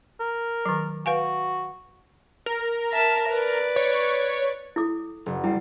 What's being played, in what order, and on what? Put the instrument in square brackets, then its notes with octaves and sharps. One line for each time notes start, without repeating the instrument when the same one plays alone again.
[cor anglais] A#4
[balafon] D#3 F#3
[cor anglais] F#4 [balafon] B4 F5 G#5
[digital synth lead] A#4
[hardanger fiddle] E5 A5
B4 D5
[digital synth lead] C#5
[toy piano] E4 A4 D6
[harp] F#1
[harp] G3 [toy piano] E4 F#5